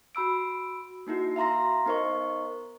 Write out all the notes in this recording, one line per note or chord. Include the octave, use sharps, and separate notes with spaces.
F#4 B5 E6 D7
A#3 D#4 E4 F#4
E5 F5 A#5 C6 A#6
B3 D#4 A#4 C5 D#5 C#6